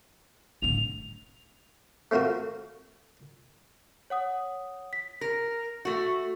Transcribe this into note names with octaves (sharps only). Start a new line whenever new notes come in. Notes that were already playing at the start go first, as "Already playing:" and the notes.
A2 D3 F7
A3 C4 F4 F#4 A#4
C#5 F#5 D#6
B6
A#4 A#6
A3 F#4